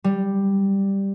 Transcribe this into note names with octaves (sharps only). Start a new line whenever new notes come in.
G3